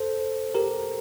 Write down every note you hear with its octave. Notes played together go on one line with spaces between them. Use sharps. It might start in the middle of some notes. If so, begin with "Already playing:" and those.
Already playing: A4 C5
G4 A#4